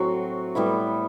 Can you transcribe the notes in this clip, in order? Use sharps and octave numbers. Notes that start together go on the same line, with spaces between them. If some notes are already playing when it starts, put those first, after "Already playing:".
Already playing: A2 F#3 C4 F#4
A2 G3 B3 E4